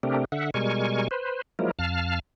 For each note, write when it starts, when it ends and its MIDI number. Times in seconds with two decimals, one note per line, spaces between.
0.03 0.25 48
0.03 0.25 57
0.03 0.25 60
0.03 0.25 62
0.03 0.25 67
0.03 0.25 70
0.32 0.50 50
0.32 0.50 76
0.32 0.50 78
0.54 1.08 47
0.54 1.08 55
0.54 1.08 56
0.54 1.08 70
0.54 1.08 80
0.54 1.08 85
1.11 1.42 71
1.11 1.42 72
1.59 1.71 53
1.59 1.71 54
1.59 1.71 56
1.59 1.71 58
1.59 1.71 64
1.59 1.71 70
1.79 2.19 41
1.79 2.19 77
1.79 2.19 81
1.79 2.19 89